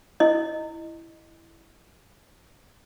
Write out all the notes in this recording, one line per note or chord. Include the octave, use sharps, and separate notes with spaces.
E4 D#5